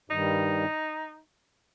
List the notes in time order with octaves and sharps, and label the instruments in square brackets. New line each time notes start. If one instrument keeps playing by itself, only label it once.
[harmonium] G2 D#3 G3 [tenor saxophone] D#4